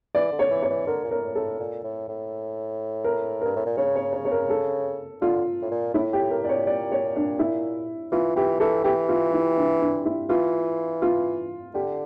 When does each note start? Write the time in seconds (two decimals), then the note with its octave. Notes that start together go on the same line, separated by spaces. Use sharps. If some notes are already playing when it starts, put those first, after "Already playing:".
0.15 E3 D5
0.32 D3
0.39 C#5
0.50 E3
0.62 C#5
0.69 E3
0.87 D3 A#4
1.04 A#2
1.11 A2 A#4
1.35 A2 A4
1.60 A#2
1.84 A2
2.08 A2
3.04 A#4
3.41 G2 A#4
3.56 A2
3.66 A#2
3.77 C#3 C#5
3.96 C#5
4.13 C#5
4.25 C#5
4.31 A#4
4.50 A4
5.21 D3 F4
5.62 A2
5.71 A#2
5.94 A2 E4
6.13 G4
6.19 A2
6.31 A#4
6.43 A#2 D5
6.49 C#5
6.67 D5
6.92 C#5
7.16 D4
7.39 E4
8.12 E3 F4
8.36 E3 G4
8.60 E3 A4
8.84 E3 G4
9.09 F4
9.33 E4
9.57 D4
9.81 D4
10.05 E4
10.29 E3 F4
11.02 F4
11.74 D3 G4